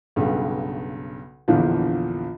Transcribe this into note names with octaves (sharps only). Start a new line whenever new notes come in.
B1 G2 C#3
A#1 E2 D3 E3 F3